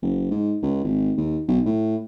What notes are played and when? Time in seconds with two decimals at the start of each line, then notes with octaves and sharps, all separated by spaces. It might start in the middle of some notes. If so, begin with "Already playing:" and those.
0.02 F#1
0.31 G#2
0.62 C#2
0.84 G#1
1.17 D#2
1.48 B1
1.66 A2